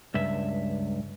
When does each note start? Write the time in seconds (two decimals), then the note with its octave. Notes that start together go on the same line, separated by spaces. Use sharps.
0.14 C#2 G2 E5